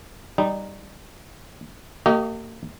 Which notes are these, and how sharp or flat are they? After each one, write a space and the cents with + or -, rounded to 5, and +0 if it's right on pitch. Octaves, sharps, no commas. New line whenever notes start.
G3 +0 D#4 -10
A#3 -45 G4 -30 D#5 +0